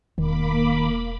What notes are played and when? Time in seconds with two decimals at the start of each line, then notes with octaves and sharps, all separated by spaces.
0.18 E1 D#3 A#3 B5 D6